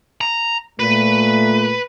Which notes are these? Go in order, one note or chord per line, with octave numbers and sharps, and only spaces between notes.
A#5
A#2 A3 B4